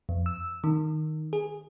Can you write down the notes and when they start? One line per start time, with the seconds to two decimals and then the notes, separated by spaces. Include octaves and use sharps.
0.09 F2
0.26 E6
0.64 D#3
1.33 G#4